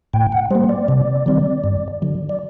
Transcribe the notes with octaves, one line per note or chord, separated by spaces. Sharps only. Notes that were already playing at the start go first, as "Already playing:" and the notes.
A2 G5
F#5
G3 A#3 C5
D5
C3
D#3 G3 C4
G2
D3 F#3
D5